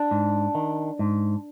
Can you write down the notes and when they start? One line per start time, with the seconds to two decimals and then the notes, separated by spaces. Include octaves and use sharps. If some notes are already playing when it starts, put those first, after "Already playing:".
Already playing: D4
0.11 G#2
0.55 D#3
0.99 G#2